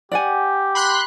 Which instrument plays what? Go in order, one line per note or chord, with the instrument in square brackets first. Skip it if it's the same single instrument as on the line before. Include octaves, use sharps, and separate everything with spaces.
[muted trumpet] G4 [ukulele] D5 F#5 G#5
[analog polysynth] B5 C6 F#6